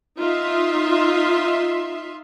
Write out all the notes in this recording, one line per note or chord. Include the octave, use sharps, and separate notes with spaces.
D#4 F4 E5 C6